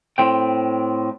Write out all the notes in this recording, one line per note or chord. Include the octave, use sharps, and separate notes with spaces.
A2 C4 G5